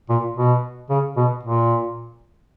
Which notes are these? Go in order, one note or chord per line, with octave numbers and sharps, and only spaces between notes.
A#2
B2
C#3
B2
A#2